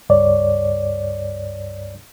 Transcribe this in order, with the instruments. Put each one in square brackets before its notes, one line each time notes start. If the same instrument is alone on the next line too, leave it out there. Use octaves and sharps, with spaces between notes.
[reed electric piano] C#2 G2 C#5 D5